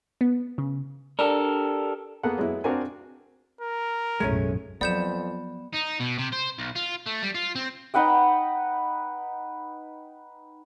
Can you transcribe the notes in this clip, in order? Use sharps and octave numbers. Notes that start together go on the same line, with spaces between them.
B3
C#3
D4 G4 A4 A#4
A#3 B3 G#4 A4 F#5
F#3 G#3 B3 E4
C4 D4 F#4 A#4 F5 G#5
A#4
B1 F#2 A2 G#3 A3 C#4
F2 F3 F#3 B3 D5 G6 E7
D#4
B2
C3
C5
B1
F4
A3
G3
F4
C4
D#4 B4 F#5 G5